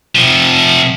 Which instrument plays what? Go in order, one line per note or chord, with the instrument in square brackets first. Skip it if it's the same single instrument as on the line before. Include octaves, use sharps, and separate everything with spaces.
[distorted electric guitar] C3 F3